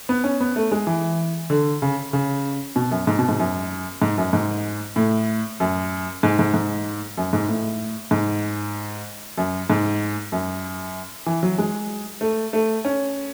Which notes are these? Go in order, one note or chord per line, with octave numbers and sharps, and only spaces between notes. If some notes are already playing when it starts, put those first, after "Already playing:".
B3
C#4
B3
A3
G#3
E3
D3
C#3
C#3
B2
F#2
G#2
B2
G#2
F#2
G#2
F#2
G#2
A2
F#2
G#2
G#2
G#2
F#2
G#2
A2
G#2
F#2
G#2
F#2
E3
F#3
G#3
A3
A3
C#4